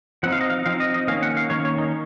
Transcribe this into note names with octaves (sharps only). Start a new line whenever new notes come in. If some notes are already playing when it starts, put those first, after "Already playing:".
F3 C4 D#4 F#5
F5
D#5
F5
F3 C4 D#4 F5
D#5
D#5
D#3 A#3 C#4 F5
F#5
F5
D#3 A#3 C#4 C#5
C#5
D#4